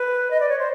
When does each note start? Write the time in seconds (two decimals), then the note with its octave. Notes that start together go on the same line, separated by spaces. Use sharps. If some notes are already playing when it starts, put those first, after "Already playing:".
Already playing: B4
0.31 D#5
0.40 D5
0.49 C#5
0.59 C5